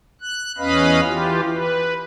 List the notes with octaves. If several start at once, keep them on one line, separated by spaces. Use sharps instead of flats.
F#6
E2 C#4 B4 D#5 F5 B5
E3 F4 G4
B4